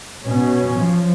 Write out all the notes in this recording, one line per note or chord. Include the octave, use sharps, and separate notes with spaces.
B2 C#4
F3